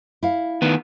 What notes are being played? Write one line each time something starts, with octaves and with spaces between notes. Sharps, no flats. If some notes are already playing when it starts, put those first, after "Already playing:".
E4 F5
D#3 B3